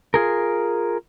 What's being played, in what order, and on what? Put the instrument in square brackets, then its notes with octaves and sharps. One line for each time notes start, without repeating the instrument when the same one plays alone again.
[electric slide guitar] F4 G#4 A#4